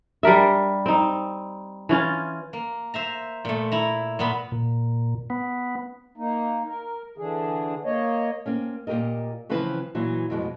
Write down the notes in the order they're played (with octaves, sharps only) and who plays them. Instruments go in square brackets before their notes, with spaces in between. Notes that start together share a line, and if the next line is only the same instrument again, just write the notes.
[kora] G3 D4 A#4 E5
C4 D#4
E3 C#4 F4
[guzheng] A#3
C5 E5 A#5
A#2 A3
E4 A#5
A#2 B3 B5
[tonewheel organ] A#2
B3
[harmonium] A#3 D#4
A#4
D3 E3 D4 G#4
A#3 C#5 D#5
[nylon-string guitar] A#3 C4 C#4
A#2 D#3 G4 A#4 D#5
C#3 E3 F3 C4 B4
A#2 E3 F#3
F2 B2 G#3